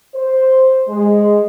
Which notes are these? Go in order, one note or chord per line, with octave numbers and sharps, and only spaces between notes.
C5
G#3